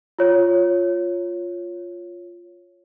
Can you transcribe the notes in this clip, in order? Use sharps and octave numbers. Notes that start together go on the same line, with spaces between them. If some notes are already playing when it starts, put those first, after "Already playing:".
F4 C#5